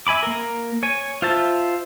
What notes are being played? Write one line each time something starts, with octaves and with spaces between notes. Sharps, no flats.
E5 G#5 B5 D6
A#3 A#4
C#5 G#5
F4 C5 E5 A5